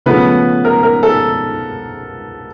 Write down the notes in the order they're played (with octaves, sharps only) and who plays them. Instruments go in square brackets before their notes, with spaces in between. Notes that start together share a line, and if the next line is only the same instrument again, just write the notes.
[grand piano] C#3 F3 A3 B3 B4
A#4
A#4
A4